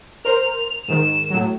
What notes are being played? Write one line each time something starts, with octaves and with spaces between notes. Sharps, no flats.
A#4 C5 F7
G#2 D#3 E7
A2 F#3